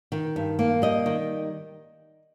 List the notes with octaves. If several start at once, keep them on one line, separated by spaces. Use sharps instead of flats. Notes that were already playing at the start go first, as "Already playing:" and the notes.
D#3
G2
A#3
G3 D#5
D#3